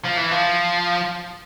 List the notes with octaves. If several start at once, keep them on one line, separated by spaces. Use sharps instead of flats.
F3
E3
F3